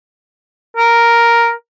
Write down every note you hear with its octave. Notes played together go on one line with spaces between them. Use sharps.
A#4